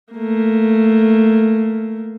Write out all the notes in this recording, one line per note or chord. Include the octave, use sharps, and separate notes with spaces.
A3 A#3